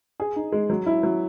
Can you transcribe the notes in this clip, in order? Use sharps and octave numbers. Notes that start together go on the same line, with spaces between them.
G#4
D#4
G#3
F#3
E4
F#3